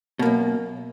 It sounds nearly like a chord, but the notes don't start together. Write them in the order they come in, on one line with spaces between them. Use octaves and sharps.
B2 A#3 F#2